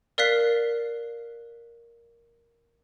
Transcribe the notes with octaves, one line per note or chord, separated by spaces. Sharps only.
A#4 D5 F5 F#6 B6 C7